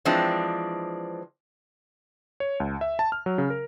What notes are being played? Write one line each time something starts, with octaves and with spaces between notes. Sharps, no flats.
E3 F3 G#3 C4 D4
C#5
C#2
E5
A5
F6
F#3
C#3
A#4